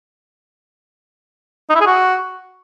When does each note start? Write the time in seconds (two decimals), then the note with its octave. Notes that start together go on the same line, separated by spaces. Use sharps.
1.70 D#4
1.75 E4
1.81 G#4
1.86 F#4